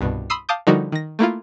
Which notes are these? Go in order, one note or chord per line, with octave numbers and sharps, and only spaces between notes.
C2 G2 B2
B5 C6 D#6 E6 C7
F5 A5 D6 D#6 G6
D3 F3 G3 D#4 F#4 A#4
D#3 A#6
A3 A#3 E4 F4